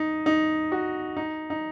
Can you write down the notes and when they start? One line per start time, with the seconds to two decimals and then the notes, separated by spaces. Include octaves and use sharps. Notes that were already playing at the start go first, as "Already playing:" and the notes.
Already playing: D#4
0.26 D#4
0.72 F#4
1.17 D#4
1.50 D#4